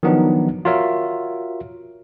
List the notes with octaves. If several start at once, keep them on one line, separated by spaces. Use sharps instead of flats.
D#3 F3 F#3 B3 D4 D#4
F4 F#4 A#4 C#5 E5